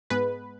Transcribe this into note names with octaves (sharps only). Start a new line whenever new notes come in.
G#2 G#3 B3 B4